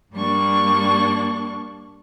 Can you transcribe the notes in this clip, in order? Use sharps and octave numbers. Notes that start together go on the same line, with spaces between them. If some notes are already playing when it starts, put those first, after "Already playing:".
G2 G3 A#3 D4 C#6